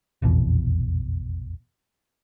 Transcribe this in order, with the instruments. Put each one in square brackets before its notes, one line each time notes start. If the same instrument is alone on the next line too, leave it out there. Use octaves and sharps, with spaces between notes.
[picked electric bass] F1 A#1 E2 B2